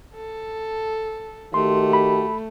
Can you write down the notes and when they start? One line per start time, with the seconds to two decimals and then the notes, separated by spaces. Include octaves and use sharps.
0.15 A4
1.54 D#3 A3 F#4 G4 C6
1.93 B5